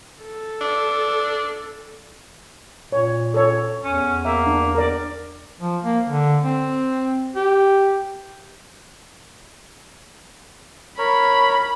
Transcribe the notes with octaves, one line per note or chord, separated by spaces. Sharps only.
A4
D4
A#2 C#5
A4 C#5
E2 C#4
A#3 E5
D4
A#4 D5
F3
A#3
D3
C4
G4
A#4 C#5 B5